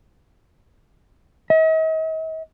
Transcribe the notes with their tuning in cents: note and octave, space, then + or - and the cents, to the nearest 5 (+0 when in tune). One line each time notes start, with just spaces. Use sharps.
D#5 +45